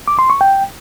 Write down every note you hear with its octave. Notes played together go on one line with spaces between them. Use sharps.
D6
C6
C#6
G5